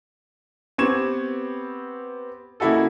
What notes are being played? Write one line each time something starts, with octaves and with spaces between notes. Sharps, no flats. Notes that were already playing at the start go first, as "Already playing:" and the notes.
B3 C4 G4 C#6 G#6 E7
C#3 A#3 E4 F#4 A4